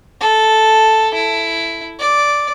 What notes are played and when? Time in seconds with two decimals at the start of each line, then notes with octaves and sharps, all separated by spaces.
0.21 A4
1.14 E4
2.00 D5